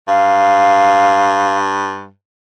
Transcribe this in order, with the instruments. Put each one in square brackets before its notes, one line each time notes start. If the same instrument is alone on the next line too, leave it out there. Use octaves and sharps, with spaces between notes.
[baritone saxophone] G2 [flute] F5